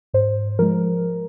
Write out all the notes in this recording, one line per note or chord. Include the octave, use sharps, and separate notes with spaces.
G#2 C5
F3 G#3 A#4